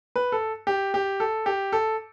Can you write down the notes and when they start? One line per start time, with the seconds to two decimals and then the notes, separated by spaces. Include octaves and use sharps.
0.16 B4
0.32 A4
0.67 G4
0.94 G4
1.20 A4
1.46 G4
1.73 A4